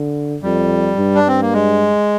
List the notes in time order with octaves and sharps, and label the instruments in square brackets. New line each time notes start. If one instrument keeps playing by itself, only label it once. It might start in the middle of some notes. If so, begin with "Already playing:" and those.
Already playing: [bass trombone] D3
[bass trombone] F2 [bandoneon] G3
[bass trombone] G2
[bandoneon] D4
C4
A#3
G#3